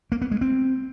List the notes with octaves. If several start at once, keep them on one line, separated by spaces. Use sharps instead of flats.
A#3
B3
G#3
C4